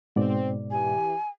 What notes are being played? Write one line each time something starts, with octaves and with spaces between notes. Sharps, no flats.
G#2 B2 C4 D5
E3 G4 G#5